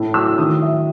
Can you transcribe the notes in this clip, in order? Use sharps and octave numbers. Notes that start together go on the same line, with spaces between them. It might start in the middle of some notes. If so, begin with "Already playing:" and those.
Already playing: A2 E4
F#3 E6
D#3 D#6
F#3 E5